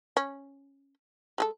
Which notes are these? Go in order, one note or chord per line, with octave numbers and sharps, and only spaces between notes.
C#4
G#3 G#4 A4